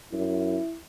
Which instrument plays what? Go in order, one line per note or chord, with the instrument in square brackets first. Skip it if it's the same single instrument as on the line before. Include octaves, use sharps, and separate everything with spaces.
[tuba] F#2 [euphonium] E4